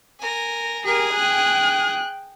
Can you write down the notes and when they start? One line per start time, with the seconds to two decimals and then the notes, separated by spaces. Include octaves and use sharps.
0.20 A#4 G#5
0.85 G4 G#4 A#4 G#5
1.14 G5 F#6